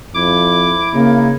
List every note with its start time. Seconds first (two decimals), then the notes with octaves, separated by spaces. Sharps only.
0.15 F2 E4 D6
0.93 C#3 A#3 D#4